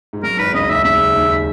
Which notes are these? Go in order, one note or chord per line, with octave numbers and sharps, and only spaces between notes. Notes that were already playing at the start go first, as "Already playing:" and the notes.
G#2
F#2 A#4
G#1 G#2 B4
C#2 C#3 D#5
D#2 D#3 E5
C#2 C#3 E5
D#2 D#3